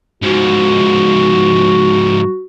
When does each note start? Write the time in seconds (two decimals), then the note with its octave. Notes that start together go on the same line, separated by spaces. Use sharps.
0.23 G#2 F3 F#4